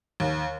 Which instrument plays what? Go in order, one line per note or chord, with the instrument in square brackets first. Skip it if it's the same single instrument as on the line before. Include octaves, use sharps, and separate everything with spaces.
[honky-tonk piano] D#2